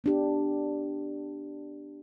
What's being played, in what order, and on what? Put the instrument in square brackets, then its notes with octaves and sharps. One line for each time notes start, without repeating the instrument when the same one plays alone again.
[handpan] B3 D4 G4